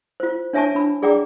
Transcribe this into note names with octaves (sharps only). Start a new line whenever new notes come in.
F4 C5
D4 C#5 E5 G#5 A5 C#6
D4 B5
G#4 D5 G5 A#5 D6